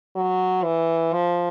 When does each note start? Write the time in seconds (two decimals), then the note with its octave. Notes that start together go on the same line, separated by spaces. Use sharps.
0.16 F#3
0.64 E3
1.13 F3